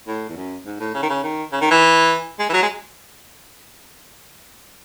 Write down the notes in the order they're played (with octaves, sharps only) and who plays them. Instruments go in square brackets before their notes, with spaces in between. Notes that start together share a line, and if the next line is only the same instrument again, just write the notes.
[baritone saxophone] A2
E2
F#2
G#2
A2
C#3
D#3
C#3
D#3
C#3
D#3
E3
G#3
E3
F#3
G#3